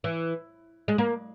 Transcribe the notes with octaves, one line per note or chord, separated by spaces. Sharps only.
E3
G#3
A#3